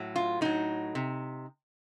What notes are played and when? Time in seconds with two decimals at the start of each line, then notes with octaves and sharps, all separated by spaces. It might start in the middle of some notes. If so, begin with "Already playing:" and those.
Already playing: A2 F#3
0.16 F4
0.41 A2 F#3 D#4
0.95 C3